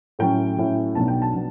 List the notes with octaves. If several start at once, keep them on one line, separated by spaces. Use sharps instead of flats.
A2 F#3 C#4 E4 G5
A2 F#3 C#4 E4
B1 B2 F#3 B3 D4 A5
G5
A5
B2 F#3 B3 D4